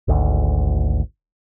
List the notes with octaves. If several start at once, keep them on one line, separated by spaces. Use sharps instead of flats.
G#1 D2